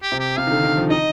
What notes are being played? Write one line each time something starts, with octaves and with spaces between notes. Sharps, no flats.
G4
C3
G4
C3 F5
D#3
D3
D#3
F3
D#4 D#5